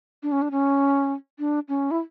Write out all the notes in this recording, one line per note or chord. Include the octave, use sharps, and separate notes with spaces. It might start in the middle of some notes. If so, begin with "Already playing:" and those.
D4
C#4
D4
C#4
D4
C#4
E4